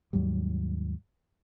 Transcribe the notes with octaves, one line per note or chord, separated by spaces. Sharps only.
D#2 G#2 F#3 G3